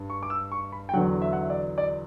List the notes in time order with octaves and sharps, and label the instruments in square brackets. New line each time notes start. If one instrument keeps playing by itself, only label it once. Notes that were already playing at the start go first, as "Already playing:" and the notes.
Already playing: [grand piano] G2
C#6
D6
E6
C#6
B5
G5
E2 D3 F#3 F#5
E5
F#5
E5
D5
D5